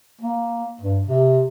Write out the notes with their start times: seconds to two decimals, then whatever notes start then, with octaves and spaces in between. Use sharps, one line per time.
0.21 A#3
0.81 G2
1.07 C3